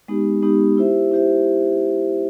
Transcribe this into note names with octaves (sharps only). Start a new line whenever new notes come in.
G#3 B3 D#4 G4
G#3 B3 D#4 G4
E4 G4 C5 E5
E4 G4 C5 E5